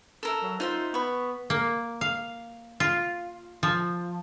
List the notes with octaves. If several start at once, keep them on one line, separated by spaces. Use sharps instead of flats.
A4 A#4 E5
F#3
D#4 F4 C5 E5
B3 B5 C#6
A#3
F5
F4
F3